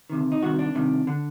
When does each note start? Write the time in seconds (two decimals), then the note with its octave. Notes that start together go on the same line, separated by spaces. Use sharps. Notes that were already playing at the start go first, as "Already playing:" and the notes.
0.10 D2 C3 D#3
0.32 D#4
0.42 C2 C3 D#3 F#4
0.59 D4
0.75 C2 C3 D#3
1.07 D3